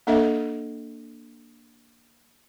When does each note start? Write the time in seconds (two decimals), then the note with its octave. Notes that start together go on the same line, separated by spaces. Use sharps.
0.07 A#3 D4 A4 D#5 E5